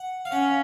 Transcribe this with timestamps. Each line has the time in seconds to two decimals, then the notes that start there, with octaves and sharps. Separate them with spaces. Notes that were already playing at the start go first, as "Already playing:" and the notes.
Already playing: F#5
0.25 F5
0.32 C#4 F#5